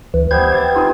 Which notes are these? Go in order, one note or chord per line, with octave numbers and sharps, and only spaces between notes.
D2 E3
G3 B3 C5 E5 G#6
G4 A5
C4 D#4 F4 G#4